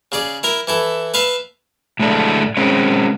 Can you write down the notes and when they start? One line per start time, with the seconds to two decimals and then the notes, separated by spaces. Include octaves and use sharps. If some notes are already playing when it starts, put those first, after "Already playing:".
0.12 C#3 G#4 D5
0.43 E4 A#4 A#5
0.67 E3 E4 A4
1.14 B4 E5 F5 A5
1.99 A2 G#3 A3 D4
2.57 G#3 C4 C#4